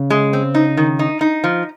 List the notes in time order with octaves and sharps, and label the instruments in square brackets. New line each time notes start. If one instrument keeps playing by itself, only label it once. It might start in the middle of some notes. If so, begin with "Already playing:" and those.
Already playing: [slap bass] C#3
[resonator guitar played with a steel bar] G#3
C4
D#4
D#3
D#4
D#4
F3